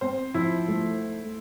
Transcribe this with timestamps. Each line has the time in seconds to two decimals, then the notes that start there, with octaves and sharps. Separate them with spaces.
0.01 C4 C5
0.34 F3 E4
0.68 A3